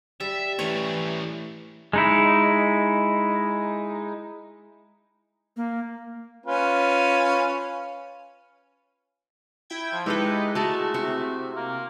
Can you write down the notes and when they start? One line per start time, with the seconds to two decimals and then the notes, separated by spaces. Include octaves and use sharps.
0.20 G3 E5
0.59 E3 A3 C#4 C#5
1.93 G#3 D#4 E4
5.57 A#3
6.46 C#4 F4 B4
9.70 E4 G5 G#6
9.93 F3
10.06 G#3 D#4 E4 G4 A4 B4
10.55 G#3 A3 F#4 A5
10.94 C3 F#4
11.56 A#3